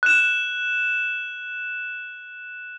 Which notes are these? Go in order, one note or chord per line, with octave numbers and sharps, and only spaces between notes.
F#6 E7